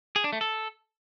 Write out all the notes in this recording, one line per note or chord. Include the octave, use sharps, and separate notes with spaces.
G#4
D4
A3
A4